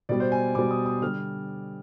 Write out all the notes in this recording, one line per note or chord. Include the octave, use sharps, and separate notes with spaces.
B2 G3 D5
C5
G#5
B2 G3 D6
D#6
D#6
D3 G3 F6